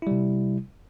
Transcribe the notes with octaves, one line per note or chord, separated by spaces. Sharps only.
C3 G3 E4